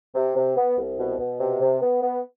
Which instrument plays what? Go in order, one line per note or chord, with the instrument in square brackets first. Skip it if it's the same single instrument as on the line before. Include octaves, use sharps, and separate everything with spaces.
[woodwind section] C3
C3
B3
C2
B2
B2
C3
C3
B3
B3